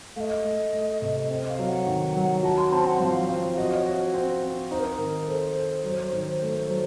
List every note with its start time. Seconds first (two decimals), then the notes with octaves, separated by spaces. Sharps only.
0.16 A3 D#5 F5
0.45 A3
0.73 A3
1.02 C3
1.30 C4 D#5
1.49 F5
1.59 F#3
1.68 F#5
1.86 D#3
2.16 F#3
2.43 F#4 A5
2.57 C6
2.72 C4 A5
2.87 F#5
3.00 F3 F5 F#5
3.28 C4 F5
3.57 F#4 D#5
3.76 C#5
3.86 F#4
4.14 C4
4.43 C4
4.71 D#4 C5
4.79 A#4
4.97 D#3 A#4
5.28 A4 C5
5.56 A4
5.84 F#3
6.13 D#3
6.42 A3
6.70 F#3